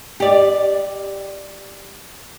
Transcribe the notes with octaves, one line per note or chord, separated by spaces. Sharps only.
G4 D5